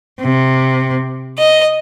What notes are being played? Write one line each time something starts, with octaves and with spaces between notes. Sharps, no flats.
C3
D#5